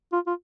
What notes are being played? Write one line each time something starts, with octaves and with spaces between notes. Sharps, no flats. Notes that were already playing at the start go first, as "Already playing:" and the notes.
F4
F4